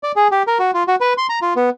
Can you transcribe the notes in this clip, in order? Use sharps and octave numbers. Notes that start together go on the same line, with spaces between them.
D5
G#4
G4
A#4
F#4
F4
F#4
B4
C6
A#5
F4
B3